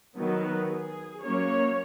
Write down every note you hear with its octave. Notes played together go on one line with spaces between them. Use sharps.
D#3 F#3 B3
G#4
F#3 A#3 C#4 C#5